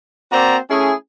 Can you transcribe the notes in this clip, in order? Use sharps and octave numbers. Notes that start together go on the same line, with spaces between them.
A#3 C4 F#4 C5 D5 A#5
A3 C#4 E4 G#4